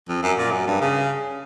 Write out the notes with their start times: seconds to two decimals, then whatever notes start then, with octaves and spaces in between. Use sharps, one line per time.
0.08 F2
0.23 F#2
0.38 A#2
0.51 F#2
0.66 G2
0.81 C#3